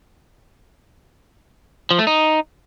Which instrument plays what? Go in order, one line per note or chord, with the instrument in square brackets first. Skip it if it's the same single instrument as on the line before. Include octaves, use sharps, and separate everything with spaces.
[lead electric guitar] F3
A3
D#4